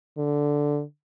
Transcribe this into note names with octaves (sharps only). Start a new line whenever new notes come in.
D3